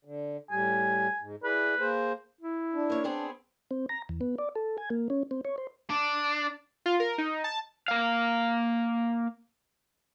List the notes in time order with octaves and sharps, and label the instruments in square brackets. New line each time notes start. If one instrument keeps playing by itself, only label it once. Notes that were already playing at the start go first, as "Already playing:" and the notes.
[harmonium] D3
[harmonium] A2 G3 [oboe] G#5
[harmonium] G#2
[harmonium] E4 G#4 D5 [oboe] B4
[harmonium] A#3 G#4 C5
[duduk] E4
[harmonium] D4
[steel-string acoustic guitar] A#3 C#5
B3 C4 G#4
[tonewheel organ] C4
A#5
E2
B3
D5
A4
G#5
A#3
C#4
C4
C#5
C5
[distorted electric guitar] D4
[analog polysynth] F4
A#4
D#4
A5
[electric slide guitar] A#3 F5